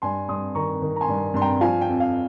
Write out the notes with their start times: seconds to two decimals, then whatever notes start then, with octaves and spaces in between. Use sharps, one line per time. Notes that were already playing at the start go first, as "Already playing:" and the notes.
0.02 G2 G#5 C6
0.28 G2 C6 D#6
0.55 D#3 A#5 C#6
0.82 D#3
0.96 A#5
1.01 G#5 C6
1.08 G2
1.34 G2 C6
1.41 G5 A#5
1.61 F3 F5 G#5
1.81 G5
1.88 F2
2.00 F5